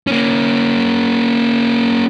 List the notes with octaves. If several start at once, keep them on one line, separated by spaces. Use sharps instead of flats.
A#3 C#4